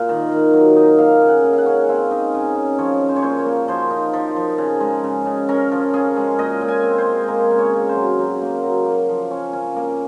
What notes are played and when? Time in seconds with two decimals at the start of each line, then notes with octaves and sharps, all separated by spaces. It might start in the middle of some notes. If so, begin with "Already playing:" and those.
Already playing: A#2 A#3 F5
0.09 D#3
0.32 D#3
0.53 F#3
0.76 D#4
0.98 A#3 F5
1.22 C#3
1.28 F#5
1.44 C#3
1.53 F5 F#5
1.66 C#4
1.89 C4 F5
2.11 D#4
2.34 C#3
2.56 C#3
2.79 F3 C#5
3.01 C#4
3.09 C5
3.16 C#5
3.22 A#2 C5
3.39 C#5
3.46 A#3
3.68 F3 C5
3.90 D#4
4.13 F3
4.36 F3
4.58 C#3
4.80 G#3
5.04 C#3
5.26 C#3
5.49 C#4 A#4
5.72 F3
5.94 C#4 G#4
6.17 G#3
6.39 A#2 D#5
6.61 A#2
6.68 G#5
6.83 C4
6.98 C5
7.06 G#3
7.28 A#3 A#4
7.51 C#3
7.59 C#5
7.73 C#3
7.89 C5
7.95 F#3
8.19 F#3
8.42 A#3
8.63 F#3
8.86 A#3
9.09 F3
9.31 C#4
9.53 C#4
9.76 A#3